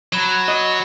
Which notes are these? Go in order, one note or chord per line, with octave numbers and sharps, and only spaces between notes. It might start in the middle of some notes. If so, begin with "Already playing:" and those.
F#3 B5 G#6 E7
D#5